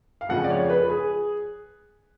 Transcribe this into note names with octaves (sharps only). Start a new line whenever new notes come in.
F5
F2 C#3 F3 F#5
D5
C#5
B4
G#4